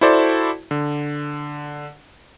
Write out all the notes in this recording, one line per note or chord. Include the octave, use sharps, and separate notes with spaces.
E4 F#4 A4 C5 D5 A5
D3